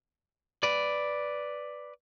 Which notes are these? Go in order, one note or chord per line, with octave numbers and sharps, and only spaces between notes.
B4 D5